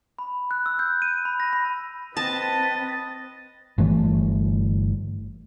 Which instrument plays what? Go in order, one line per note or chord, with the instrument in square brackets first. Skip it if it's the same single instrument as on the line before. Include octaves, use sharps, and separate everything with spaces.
[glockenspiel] B5
F#6
E6
G6
D#7
B5
A#6
B5
[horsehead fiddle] C4 B4 [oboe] D#5 [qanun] A5 [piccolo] A6
[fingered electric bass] G1 E3 A3